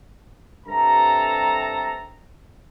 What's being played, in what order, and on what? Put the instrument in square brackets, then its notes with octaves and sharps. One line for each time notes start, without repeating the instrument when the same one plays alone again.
[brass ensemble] G2 C3 A4 A#5